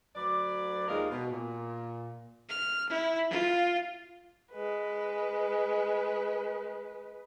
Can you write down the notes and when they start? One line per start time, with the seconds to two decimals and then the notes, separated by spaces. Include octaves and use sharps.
0.15 D2 F#3 B4 D5
0.88 D#2 G#3 F4 A#4 D#5 F5
1.10 B2
1.31 A#2
2.49 F6
2.89 E4
3.30 F4
4.53 G#3 B4